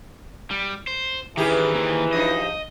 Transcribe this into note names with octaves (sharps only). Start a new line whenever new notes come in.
G3
C5
D#3 E3 C#4 G4 G#4
D#3 A#3 C4
G2 F3 D#4 D#5